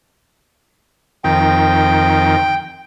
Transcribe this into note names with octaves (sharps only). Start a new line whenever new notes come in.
F2 D#3 G5